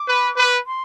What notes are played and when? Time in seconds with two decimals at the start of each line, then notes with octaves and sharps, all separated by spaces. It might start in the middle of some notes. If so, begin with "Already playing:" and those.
Already playing: D6
0.08 B4
0.37 B4
0.66 C6